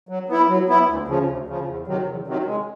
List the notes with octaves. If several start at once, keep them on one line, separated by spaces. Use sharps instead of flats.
F#3
B3 E4
F#3
B3 E4
D2
C#3 F3
D2
C#3 F3
E2
C3 D#3 F#3
E2
C3 D#3 F#3
G#3